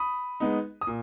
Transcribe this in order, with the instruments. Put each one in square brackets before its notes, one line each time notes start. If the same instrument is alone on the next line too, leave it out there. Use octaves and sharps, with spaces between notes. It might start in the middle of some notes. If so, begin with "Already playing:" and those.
Already playing: [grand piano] B5 D#6
G#3 B3 D#4
D#6
A#2